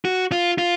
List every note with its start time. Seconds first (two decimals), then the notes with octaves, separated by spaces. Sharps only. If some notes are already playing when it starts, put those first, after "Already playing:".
0.05 F#4
0.32 F4
0.58 F4